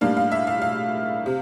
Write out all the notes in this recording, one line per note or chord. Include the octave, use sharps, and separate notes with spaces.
A2 G3 A#3 D4 F5
F5
E5
F5
F5
C3